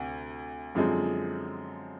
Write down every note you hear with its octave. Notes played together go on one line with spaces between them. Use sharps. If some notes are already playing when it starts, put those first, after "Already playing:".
Already playing: D2 C3
F#2 D3 F3 G#3 C4